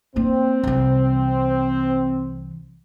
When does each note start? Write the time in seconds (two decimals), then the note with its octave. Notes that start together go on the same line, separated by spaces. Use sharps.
0.16 A#3 C4 D4
0.64 C2 E3